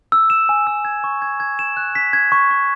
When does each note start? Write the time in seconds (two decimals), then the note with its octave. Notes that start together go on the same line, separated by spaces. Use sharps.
0.12 E6
0.30 E7
0.49 G#5
0.67 E6
0.85 G#6
1.04 C#6
1.22 G#6
1.40 G#6
1.59 E7
1.77 F#6
1.95 B6
2.13 G#6
2.32 C#6
2.51 C#6